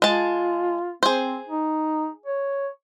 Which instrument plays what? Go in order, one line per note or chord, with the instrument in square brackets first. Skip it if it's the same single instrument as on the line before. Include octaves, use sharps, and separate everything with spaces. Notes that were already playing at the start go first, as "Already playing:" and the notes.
[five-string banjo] G#3 A5 [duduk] F4
[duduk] C4 [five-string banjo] G#4 C5
[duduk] D#4
C#5